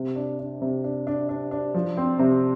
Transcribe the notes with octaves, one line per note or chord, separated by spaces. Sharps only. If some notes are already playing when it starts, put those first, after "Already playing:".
Already playing: C3
D4
D4
C3
D4
D4
D4
D4
F3
C4
C3